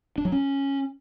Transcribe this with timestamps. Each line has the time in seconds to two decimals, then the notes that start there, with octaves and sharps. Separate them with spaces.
0.18 D4
0.25 F#3
0.32 C#4